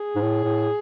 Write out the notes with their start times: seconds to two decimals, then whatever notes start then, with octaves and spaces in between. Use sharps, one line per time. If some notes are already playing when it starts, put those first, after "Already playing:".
Already playing: G#4
0.16 G#2
0.22 A2
0.45 A2